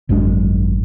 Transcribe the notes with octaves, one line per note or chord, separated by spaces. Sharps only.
G#1 F#2 G#3 D4